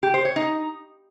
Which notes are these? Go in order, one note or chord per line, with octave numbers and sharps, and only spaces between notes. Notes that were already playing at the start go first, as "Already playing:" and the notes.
G4
C5
C#5
D#4